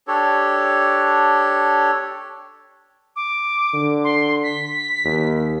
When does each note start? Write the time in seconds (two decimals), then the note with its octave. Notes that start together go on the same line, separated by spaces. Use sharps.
0.08 D4 G4 A4 C#5
3.16 D6
3.74 D3
4.04 C6
4.43 B6
5.05 D#2